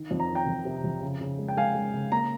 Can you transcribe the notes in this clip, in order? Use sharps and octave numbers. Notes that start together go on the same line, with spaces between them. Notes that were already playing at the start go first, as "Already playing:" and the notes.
Already playing: D#3
F2
A#5
D#3
G5 A#5
F2
C3
F2
C#3
C#3
G#3
G5
G#3 F5 G#5
G#3
C#3
A#3 A#5